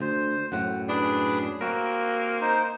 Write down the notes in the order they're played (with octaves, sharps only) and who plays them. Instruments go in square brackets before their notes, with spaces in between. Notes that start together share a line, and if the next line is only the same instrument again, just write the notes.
[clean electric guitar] D2 [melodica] C5
[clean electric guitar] F#2 A2 [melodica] F#5
[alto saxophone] D4 [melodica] G#4 B4
[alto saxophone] A#3 [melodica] C4 [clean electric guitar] F#4 A#4
[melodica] D#4 C5